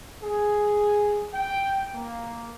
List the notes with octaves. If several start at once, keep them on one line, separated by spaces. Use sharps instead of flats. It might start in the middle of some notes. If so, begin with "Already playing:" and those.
G#4
G5
A#3